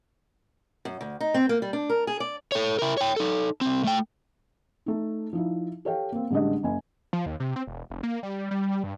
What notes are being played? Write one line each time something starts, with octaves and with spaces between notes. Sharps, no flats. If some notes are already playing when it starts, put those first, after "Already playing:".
F#2
D2
D#4
C4
A#3
G3
D4
A#4
G#4
D5
A4 C#5
E4 A#4
C#5 G5
D#4 A4
C2 C4
A3 G5
A3 D#4
F3 D#4 E4
G4 A4 C#5 F5 G5
A#3 C4
A1 D3 G3 G#3 D4 D#5
F#1 G#5
F3
D#2
C3
C4
E1
F1
A#3
G3
G3
G2